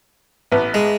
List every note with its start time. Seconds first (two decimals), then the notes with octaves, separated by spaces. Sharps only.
0.52 A1 B3
0.74 G#3